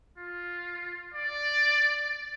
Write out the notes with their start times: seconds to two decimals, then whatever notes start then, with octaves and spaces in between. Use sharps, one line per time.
0.18 F4
1.14 D5